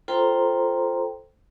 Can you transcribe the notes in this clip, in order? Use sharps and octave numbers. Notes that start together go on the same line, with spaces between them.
F4 A4 C5 G5 A#5 C6